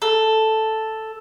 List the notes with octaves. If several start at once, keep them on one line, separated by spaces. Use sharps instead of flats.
A4